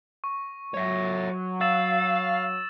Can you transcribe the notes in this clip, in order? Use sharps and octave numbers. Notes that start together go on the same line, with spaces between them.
C#6
F#3 C#5 E5
F5 E6 A6 E7